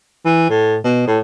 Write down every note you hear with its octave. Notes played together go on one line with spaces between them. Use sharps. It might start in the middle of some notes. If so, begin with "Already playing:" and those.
E3
A2
B2
A2